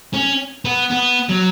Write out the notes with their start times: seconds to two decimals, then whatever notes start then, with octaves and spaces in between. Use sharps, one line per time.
0.14 C#4
0.65 B3
0.91 B3
1.29 F#3